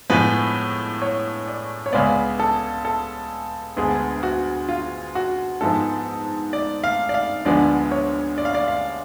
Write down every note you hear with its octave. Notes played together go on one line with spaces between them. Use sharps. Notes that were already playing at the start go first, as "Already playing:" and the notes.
A2 F3 G#3 B3 B4
C#5
D5
C#5
C#2 C#3 G#3 B3 D5
A4
A4
D2 D3 G#3 B3 G#4
F#4
F4
F#4
G#2 F3 G#3 B3 A4
D5
F5
D5
F5
D2 D3 F3 G#3 B3 D5
C#5
D5
F5
D5
F5